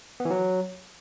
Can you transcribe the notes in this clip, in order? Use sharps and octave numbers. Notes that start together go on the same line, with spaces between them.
B3
E3
F#3